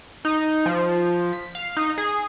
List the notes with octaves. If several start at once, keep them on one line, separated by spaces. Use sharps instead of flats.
D#4
F3
B6
F5
D#4
G#4